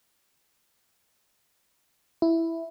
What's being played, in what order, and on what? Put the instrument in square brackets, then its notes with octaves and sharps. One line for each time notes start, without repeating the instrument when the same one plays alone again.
[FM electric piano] E4